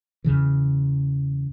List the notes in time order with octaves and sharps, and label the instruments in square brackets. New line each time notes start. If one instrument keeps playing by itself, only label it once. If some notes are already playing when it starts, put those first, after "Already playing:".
[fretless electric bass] E2 C#3 E3